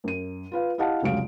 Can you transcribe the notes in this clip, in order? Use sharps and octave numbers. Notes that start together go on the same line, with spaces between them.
F#2 D#7
F4 B4 F5
E4 G4 D#5 F5 F#5 A5
F1 C#2 F#3 G#3 F5 D7